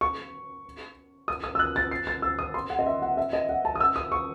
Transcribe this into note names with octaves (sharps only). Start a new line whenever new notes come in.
C#6
D#6
D#6
E6
F#6
A6
C7
A6
E6
D#6
C6
F#5
D#5
E5
F#5
E5
D#5
F#5
A5
D#6
E6
D#6
C#6